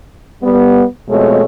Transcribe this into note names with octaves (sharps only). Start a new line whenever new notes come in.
G3 B3
F2 B2 G#3 A3 C#5